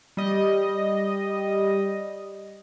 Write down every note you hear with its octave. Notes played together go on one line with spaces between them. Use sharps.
G3 D#5